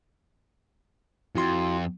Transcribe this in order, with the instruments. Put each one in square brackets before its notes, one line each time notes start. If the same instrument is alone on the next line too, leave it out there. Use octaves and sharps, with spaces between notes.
[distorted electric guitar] F2 [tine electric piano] E4 F#4 C6